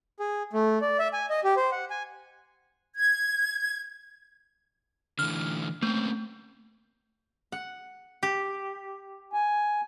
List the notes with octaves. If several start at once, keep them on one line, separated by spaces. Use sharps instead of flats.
G#4
A3
D5
E5
G#5
D#5
G4
C5
F#5
G#5
G#6
D3 E3 A3 F6
A3 A#3 C4 C#4
F#5
G4
G#5